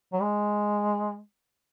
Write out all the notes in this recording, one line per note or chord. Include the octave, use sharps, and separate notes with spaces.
F#3
G#3